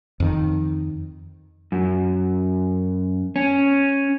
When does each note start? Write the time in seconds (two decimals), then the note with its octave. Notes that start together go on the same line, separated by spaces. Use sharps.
0.20 F2 D#3
1.72 F#2
3.36 C#4